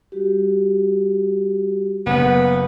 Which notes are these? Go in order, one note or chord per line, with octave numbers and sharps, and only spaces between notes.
G3 F#4 G4
F#1 F#2 B3